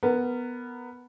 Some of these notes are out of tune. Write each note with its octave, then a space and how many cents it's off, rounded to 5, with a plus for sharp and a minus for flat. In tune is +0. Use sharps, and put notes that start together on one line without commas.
B3 +0 A#4 -15